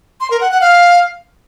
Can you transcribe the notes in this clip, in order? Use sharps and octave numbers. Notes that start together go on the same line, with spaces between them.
C6
A#4
F#5
F#5
F5